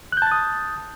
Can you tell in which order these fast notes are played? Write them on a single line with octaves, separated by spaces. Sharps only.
F#6 G6 A5 A6 D#6